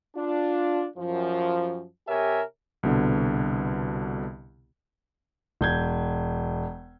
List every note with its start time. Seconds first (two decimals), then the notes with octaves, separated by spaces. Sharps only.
0.16 D4 F4
0.96 F#2 F3
2.08 C3 G4 A#4 C#5 E5 G#5
2.83 C2 B2 D3 B3
5.61 E1 G6 G#6